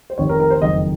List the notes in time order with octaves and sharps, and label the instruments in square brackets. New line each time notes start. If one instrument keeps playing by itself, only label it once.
[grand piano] C5
F1 F2 C3 D#3 C#5
A#4
A#4
C5
F#1 F2 D#3 D#5